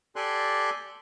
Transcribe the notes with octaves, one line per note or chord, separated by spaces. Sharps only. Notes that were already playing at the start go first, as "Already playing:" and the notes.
G4 A4 D5 G#5 C6 F#6